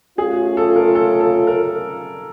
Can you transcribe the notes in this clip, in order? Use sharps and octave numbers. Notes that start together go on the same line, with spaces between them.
A3 C#4 F4 G#4
A4
A#4
A4
A4
A#4